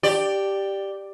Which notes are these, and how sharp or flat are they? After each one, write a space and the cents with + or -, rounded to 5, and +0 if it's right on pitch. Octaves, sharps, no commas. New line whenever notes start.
G4 +0 D5 +10